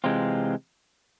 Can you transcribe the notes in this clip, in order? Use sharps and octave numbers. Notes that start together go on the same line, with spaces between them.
C3 E3 G#3 C4 F4